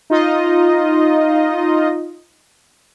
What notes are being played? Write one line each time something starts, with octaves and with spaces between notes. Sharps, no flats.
D#4 F4 D#5